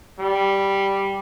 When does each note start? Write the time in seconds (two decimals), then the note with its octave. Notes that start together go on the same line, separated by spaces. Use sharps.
0.19 G3